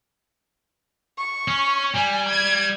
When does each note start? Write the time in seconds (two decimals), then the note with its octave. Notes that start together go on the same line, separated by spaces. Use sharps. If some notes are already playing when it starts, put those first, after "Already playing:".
1.18 C#6
1.48 C#4
1.95 G3 G#5
2.28 G#6